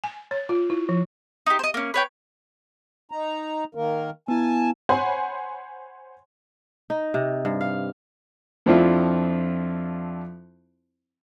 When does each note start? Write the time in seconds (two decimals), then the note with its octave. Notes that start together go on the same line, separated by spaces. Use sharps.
0.04 G#5
0.31 C#5
0.49 F4
0.70 E4
0.89 F3
1.46 D#4 G4
1.59 C5 D#5
1.74 A#3 C#4
1.94 B4 C#5 G5
3.11 D#4 A#5
3.75 D#3 A#3 A#4
4.28 B3 E4 G#5 A5
4.89 C5 C#5 F#5 G#5 B5
6.90 D#4
7.14 C3
7.45 G2
7.61 F5
8.66 F2 F3 C4 D4 E4 F4